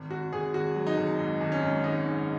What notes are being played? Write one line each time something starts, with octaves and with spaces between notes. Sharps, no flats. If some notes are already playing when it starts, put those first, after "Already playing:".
Already playing: G#1
G#1 F#4
G#1 G#4
G#1 F#4
F#3
D#4
G#1
G#2
G#1
C#4
G#2
G#1 D#4
G#2